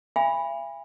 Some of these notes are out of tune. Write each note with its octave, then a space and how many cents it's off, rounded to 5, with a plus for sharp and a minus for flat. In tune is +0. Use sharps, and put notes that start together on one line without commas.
E5 +45 G#5 -35 B5 -5